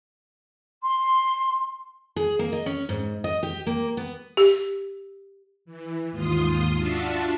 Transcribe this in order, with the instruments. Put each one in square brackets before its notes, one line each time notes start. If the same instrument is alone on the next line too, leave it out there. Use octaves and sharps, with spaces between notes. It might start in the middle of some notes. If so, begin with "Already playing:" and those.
[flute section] C6
[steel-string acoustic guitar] G#4
A#3
D#5
C#4
G#2
D#5
G4
A#3
B3
[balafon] G4
[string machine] E3
D#2 G#2 F4 C6 D#6
D4 F4 F#4 E5 A5